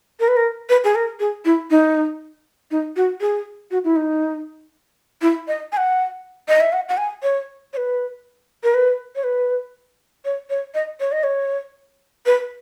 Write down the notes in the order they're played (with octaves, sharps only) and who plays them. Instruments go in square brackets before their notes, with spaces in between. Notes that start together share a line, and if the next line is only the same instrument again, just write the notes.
[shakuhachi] A#4
B4
A#4
B4
G#4
A#4
G#4
E4
D#4
D#4
F#4
G#4
F#4
E4
D#4
E4
D#5
G#5
F#5
D#5
E5
F#5
F#5
G#5
C#5
C#5
B4
A#4
B4
C#5
B4
C#5
C#5
D#5
C#5
D#5
C#5
B4